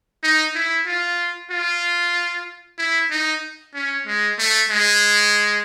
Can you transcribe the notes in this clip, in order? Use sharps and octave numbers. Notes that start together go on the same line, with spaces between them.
D#4
E4
F4
F4
E4
D#4
C#4
G#3
A3
G#3